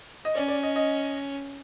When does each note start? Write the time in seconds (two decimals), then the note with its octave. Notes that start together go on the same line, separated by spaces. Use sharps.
0.25 D#5
0.35 C#4 D5
0.48 D5
0.63 D#5
0.76 D#5